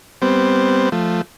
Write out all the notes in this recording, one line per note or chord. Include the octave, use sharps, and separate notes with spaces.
G3 B3 C4 C5
F3 A3